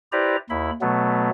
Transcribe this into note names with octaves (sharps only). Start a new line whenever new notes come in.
E4 G4 B4 C5 D5 A#5
D#2 E4 B5
B2 F#3 A3 B3